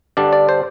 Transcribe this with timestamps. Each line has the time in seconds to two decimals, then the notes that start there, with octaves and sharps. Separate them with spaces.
0.17 G2 D3 G3 D4 D5
0.33 D5
0.49 C5